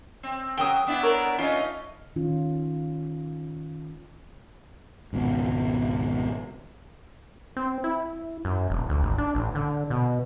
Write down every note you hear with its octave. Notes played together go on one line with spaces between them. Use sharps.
C4
C#3 F#3 A#4 G5 D#6
B3 D4 E4
A#4 C#5
A3 C#4 D#4 F4
D#3 C#4 F4
G#1 C#2 B2
C4
E4
F#2
E1
D2
G#1
D4
A1
D3
B2